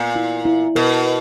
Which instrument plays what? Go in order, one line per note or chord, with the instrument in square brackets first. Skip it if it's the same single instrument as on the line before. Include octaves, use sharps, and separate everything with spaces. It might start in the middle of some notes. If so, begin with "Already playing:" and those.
Already playing: [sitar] A#2 [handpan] B3
[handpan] E4
E4
[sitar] B2 [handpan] A#4